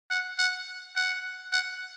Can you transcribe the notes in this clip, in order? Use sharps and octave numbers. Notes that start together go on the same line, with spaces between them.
F#5
F#5
F#5
F#5